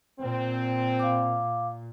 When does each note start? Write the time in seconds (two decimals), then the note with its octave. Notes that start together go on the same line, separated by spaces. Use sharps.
0.20 A#2 C4
0.99 F5 D6